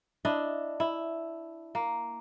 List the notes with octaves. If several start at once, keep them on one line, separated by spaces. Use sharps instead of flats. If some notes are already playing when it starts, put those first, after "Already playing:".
D4 E4 D#5
E4
A#3